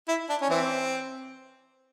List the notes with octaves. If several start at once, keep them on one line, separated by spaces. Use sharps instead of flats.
E4
D4
C#4
E3 C4